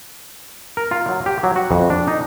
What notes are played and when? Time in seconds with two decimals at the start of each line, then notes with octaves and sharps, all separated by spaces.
0.77 A#4
0.91 F4
1.08 F#3
1.26 G4
1.43 F#3
1.56 F#4
1.71 F2
1.90 D4
2.08 D#4